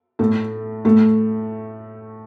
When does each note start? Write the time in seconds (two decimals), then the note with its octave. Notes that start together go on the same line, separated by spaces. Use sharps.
0.19 A2 A3
0.85 A2 A3